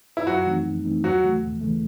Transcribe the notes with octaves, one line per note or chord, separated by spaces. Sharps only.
E4
F#2 F#3 F#4
E3 A3 C4 D#4
F#2
E3 A3 C4 D#4
D#2 F#3 F#4
C#3 E3 A3
D#2
C#3 E3 A3